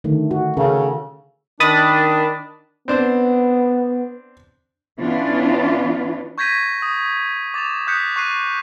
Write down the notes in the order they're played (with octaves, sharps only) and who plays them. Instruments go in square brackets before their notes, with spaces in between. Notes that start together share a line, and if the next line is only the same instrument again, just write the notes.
[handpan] D3 D#3 A3
F#4
[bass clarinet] C#3 [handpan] C#4 A4 A#4
[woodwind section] D#3 D4 [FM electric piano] B5 D#6 A6
[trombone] B3 [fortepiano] C4 D4 C5
[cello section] E3 B3 C#4 D4 F4
[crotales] C#6 G6 G#6 A#6 B6 D#7
D#6
D6 A6 E7 F7
D#6 F#6 G6 B6 C#7
C#6 F#6 C7 D#7